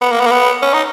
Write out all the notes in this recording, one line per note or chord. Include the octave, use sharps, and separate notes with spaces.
B3
A#3
B3
A#3
B3
C#4
D#4